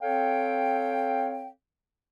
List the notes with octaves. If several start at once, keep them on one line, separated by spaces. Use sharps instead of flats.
C4 A4 C#5 F5 G5